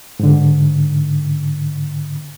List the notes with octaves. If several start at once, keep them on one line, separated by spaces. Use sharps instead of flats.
G#2 D3